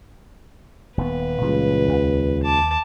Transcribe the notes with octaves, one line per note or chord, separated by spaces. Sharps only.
D#1 D#2 B3 B4
C#2 A#2 E3 G3
D#2
A5 D6